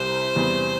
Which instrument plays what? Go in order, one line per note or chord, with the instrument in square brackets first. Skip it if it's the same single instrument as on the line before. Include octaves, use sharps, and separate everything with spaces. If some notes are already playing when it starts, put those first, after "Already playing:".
Already playing: [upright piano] C2 C3 G3 [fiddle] C5
[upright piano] E2 C3 G3 B3